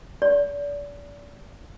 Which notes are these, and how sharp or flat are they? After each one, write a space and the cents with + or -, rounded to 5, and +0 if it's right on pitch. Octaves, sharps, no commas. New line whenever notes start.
D5 -35